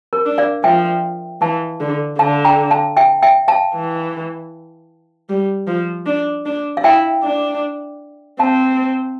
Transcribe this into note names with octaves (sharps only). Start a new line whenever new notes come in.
A#4
D4
D5 F5
F3 E5 G5
E3 F5 A5
D3
D3 F5 A5
G5 A#5
F5 A5
E5 G5
E5 G5
F5 A5
E3
G3
F3
D4
D4
F5
E4 E5 G5
D4
C4 F5 A5